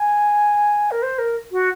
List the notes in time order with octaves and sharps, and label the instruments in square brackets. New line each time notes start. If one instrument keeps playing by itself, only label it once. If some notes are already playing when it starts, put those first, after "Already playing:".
Already playing: [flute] G#5
A#4
C5
A#4
F#4